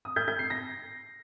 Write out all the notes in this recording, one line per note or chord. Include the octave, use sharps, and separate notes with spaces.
D#6
G6
G6
C7
A#6